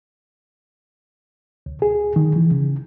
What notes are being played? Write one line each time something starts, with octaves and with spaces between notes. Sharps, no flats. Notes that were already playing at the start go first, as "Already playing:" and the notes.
D2
G#4
D#3
E3
C#3